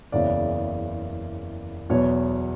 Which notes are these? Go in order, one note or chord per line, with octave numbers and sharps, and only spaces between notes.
F#1 E2 C#3 E3 D5
E2 B2 F#3 C#5